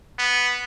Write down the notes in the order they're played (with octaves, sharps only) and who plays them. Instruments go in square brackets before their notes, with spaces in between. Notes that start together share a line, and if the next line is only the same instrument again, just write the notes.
[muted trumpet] B3